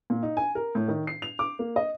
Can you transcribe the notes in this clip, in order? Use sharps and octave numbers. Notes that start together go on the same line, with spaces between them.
A#2
D#4
G#5
A#4
A2
D#3
C7
F7
D6
A#3
D#5